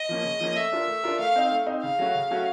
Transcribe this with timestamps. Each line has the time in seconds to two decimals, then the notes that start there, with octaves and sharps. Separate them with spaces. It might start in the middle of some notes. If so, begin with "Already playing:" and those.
Already playing: D#5
0.09 F3 A#3 C#4
0.24 C#3
0.40 F3 A#3 C#4
0.56 A3 E5
0.72 D4 F4 A#4
0.88 A3
1.04 D4 F4 A#4
1.19 A3 F5
1.36 C4 D#4
1.51 A3
1.66 C4 D#4
1.82 C#3 F5
1.99 F#3 A3 C#4 F#4
2.15 C#3
2.31 F#3 A3 C#4 F#4